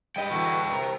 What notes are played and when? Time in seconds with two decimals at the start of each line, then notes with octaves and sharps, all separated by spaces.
0.16 G3 B4 D#5 G5
0.31 E2 B2 D3 F#4
0.72 C3 A#4